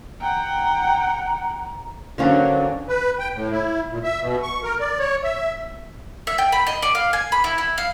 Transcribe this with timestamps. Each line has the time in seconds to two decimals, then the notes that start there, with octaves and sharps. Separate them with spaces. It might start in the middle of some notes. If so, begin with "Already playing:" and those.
0.21 F#5 G5 A#5
2.18 D3 F#3 A#3 C#4 D4 C5
2.88 B4
3.19 G5
3.34 A2
3.51 E4
3.91 A#2
4.03 E5
4.21 B2
4.43 C#6
4.64 A#4
4.80 D5
4.99 C#5
5.24 E5
6.27 E5
6.38 G5
6.52 B5
6.67 D#5
6.83 D5
6.95 F5
7.13 G#5
7.32 B5
7.44 E4
7.58 E4
7.78 F5